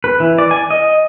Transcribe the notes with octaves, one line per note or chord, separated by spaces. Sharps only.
B4
E3
D5
G#5
D#5